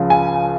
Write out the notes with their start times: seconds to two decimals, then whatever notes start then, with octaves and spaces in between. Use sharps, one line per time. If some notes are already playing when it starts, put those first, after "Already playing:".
Already playing: C#2 C#3 F3
0.10 G#5